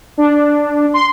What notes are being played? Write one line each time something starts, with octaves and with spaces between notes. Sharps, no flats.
D4
C6